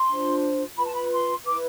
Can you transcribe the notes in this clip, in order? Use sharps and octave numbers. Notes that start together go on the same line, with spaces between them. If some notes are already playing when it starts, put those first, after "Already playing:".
Already playing: C6
D4 F4 C5
F4 B4 B5
A5
B5
C6
E4 B4 D6